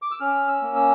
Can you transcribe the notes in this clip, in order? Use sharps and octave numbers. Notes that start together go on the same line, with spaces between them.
D6
E6
C#4 F6
E6
A#3
E6